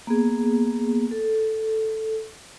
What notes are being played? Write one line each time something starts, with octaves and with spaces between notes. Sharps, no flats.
A#3 B3 G#4
A4